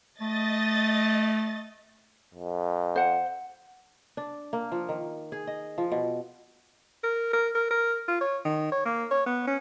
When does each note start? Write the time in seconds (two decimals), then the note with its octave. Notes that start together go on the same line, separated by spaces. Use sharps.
0.21 A3 D#5 A6
2.34 F2
2.96 C5 F#5
4.17 D4
4.53 A#3
4.72 F3
4.89 D#3
5.32 G#4
5.47 D#5
5.78 F3
5.92 B2
7.04 A#4
7.33 A#4
7.55 A#4
7.71 A#4
8.08 F4
8.21 C#5
8.45 D#3
8.72 C#5
8.86 A#3
9.11 C#5
9.26 B3
9.47 C#4